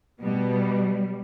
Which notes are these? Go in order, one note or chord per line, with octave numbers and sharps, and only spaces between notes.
B2 G3